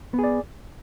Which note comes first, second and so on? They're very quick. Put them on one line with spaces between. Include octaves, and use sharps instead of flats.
B3 G#4 D5